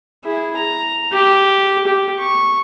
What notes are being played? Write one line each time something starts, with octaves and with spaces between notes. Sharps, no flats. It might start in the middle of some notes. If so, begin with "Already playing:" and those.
E4 G#4
A#5
G4
G4
C#6